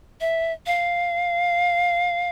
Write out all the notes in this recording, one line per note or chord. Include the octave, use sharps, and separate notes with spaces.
E5
F5